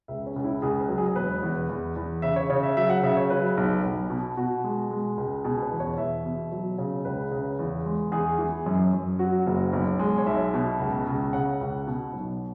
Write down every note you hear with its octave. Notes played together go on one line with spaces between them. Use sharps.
C#2 E5
C#4
C#2
E4
C#2 G#4
B4
F#3
G#4
G#4
E1 B4
E2
E2
E2
C#3 E5
C#5
C#3 C#5
E5
F#3 E5
F#5
C#3 E5
C#5
F#3 B4
B1
B1
B2
B2 F#4
G#3
G#3
C#2
B2 G#4
B4
E2
C#5
E2 E5
B2
F#3
C#3
C#2 B4
C#3
E2
G#3
E2 G#4
E3
F#2
F#2
F#3 F#4
F#1
B1
G#3
C#5
B1 E5
B2
C#2
C#2
C#3 F#5
C#2
B2
B1